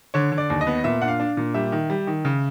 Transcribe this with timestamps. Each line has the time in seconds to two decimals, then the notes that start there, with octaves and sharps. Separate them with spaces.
0.14 D3 C#5
0.32 D3
0.38 D5
0.50 D#2
0.61 D#5
0.67 B3
0.84 A#2 E5
1.01 D4 F#5
1.08 F5
1.20 D4
1.37 A#2
1.54 G3 E5
1.72 D#3
1.90 G3
2.07 D#3
2.25 C#3